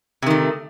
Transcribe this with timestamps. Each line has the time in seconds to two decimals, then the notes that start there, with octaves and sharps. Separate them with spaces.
0.22 C3
0.26 D#3
0.30 A3